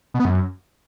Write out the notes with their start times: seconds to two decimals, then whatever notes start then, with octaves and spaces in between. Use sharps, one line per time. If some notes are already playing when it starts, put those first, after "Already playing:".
0.14 B2
0.20 B3
0.25 F#2